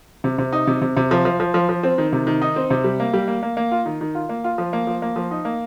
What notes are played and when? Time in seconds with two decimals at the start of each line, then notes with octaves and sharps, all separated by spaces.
0.24 C3
0.38 C3
0.53 D#4
0.67 C3
0.82 C3
0.97 C3
1.11 F3
1.25 F3
1.40 F3
1.54 F3
1.69 F3
1.83 C4
1.98 D#3
2.13 C3
2.27 D#3
2.42 D#4
2.56 C4
2.70 C3
2.84 G3
3.00 A#3
3.13 G3
3.28 A#3
3.43 A#3
3.57 A#3
3.72 F4
3.86 D#3
4.01 D#3
4.15 F4
4.29 A#3
4.44 F4
4.58 F3
4.73 A#3
4.87 F3
5.02 A#3
5.16 F3
5.31 D#4
5.45 A#3